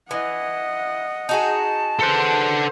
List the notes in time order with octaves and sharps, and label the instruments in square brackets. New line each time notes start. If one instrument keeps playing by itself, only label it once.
[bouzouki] E3 [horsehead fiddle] D#5 F#5
[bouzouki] D#4 F#4 G#4 [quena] A5
[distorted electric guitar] A4 F#5 [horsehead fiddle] B4 C5